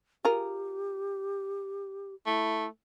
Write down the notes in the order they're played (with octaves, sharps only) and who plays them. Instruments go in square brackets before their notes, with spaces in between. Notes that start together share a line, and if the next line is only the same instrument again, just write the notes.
[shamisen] F4 G#4 A#4 [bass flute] G4
[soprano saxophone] A3 [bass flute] E4